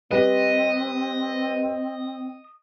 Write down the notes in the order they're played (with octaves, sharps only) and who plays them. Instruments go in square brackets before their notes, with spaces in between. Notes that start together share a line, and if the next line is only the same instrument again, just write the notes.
[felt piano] G3 B4 [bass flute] C4 [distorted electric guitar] D#5